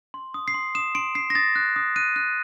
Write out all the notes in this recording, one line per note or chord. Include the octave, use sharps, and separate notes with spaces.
C6
D#6
C7
C6
D#6 E7
C6 D7
C6 C7
A#6
D#6 A6
F#6
D#6
F#6 D#7
F#6